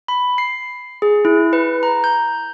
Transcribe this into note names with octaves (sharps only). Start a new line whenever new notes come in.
B5
C7
G#4
E4
B4
A#5
G6